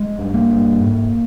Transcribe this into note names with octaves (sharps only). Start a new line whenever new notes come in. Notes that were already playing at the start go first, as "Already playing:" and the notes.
Already playing: G#3
G2
A#3
G2
G#2